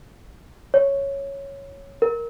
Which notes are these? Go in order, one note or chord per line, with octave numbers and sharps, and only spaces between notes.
C#5
A#4